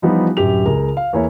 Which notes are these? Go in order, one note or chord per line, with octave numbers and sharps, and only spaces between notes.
E3 F3 G3 B3 D#4 F4
D1 F#2 G4 F7
C#2 G#4 A#4
F5
E2 A#3 E4 C#5